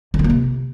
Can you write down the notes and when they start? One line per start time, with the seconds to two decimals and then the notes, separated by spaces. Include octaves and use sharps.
0.14 D3
0.19 C4
0.24 A#3
0.30 C3